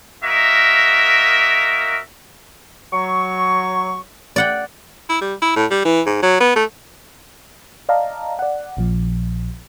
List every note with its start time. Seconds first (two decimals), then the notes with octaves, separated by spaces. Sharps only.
0.24 A#3 F#4 A#4 D#5 E5
2.93 F#3 C#6
4.36 D5 F#5 G5
5.09 E4
5.21 G3
5.42 E4
5.56 A2
5.71 G3
5.85 E3
6.06 G#2
6.23 F#3
6.40 B3
6.56 A3
7.89 D5 D#5 F5 A5 A#5
8.39 D5 F#5
8.77 A#1 A#2 F3